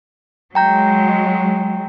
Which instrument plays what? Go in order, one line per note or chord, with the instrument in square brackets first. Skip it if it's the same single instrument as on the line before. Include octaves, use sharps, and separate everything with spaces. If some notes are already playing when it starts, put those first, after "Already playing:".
[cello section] F#3 G#3 [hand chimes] G5 A#5 G6